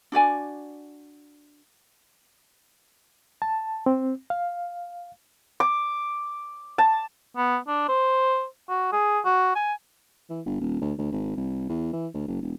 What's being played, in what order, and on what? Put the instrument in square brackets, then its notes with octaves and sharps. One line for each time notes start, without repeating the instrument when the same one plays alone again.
[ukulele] D4 F#4 D5 G#5
[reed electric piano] A5
C4
F5
[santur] D6
A5
[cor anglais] B3
D4
C5
F#4
G#4
F#4
G#5
[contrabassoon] E3
G1
D#1
D2
D2
G#1
C2
E2
E3
D2
F#1
E1